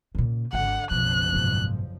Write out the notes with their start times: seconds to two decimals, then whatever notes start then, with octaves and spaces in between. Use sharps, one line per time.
0.15 A#2 C#3
0.53 G#1 D3 F#5
0.91 F#1 B1 B2 F3 F#6
1.33 G#2 B2